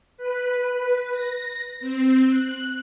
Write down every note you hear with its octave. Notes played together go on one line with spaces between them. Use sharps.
B4
A#6
C4
F#6